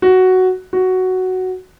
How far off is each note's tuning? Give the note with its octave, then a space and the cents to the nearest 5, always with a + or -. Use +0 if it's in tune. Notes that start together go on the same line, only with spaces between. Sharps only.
F#4 +5
F#4 +5